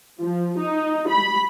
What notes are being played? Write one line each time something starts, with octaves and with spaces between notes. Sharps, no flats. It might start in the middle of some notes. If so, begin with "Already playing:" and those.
F3
D#4
B5